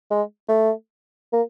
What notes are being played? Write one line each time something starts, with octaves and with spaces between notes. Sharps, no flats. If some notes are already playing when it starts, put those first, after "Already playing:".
G#3
A3
A#3